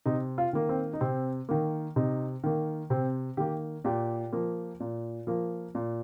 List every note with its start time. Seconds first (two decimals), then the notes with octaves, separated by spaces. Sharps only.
0.06 C3 D#4
0.38 F4
0.53 D#3 A#3
0.69 C4
0.93 D#4
1.01 C3 C4
1.49 D#3 A#3
1.96 C3 D#4
2.44 D#3 A#3
2.90 C3 C4
3.37 D#3 A#3 G4
3.85 A#2 G4
4.33 F3 A#3
4.80 A#2
5.27 F3 A#3
5.75 A#2